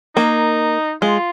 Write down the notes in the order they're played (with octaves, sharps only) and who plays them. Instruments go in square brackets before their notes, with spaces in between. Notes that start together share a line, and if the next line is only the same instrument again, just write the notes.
[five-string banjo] A#3 [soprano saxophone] D#4
[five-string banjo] G#3 [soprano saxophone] F4